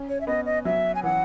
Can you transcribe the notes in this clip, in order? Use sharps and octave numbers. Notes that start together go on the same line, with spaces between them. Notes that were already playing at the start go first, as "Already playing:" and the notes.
Already playing: C#4
C#5
E5
B3 D#5
D#5
F#3 E5
G#5
E3 F#5